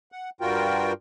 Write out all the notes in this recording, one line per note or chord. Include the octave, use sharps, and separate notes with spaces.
F#5
G2 G3 F4 F#4 A#4 G5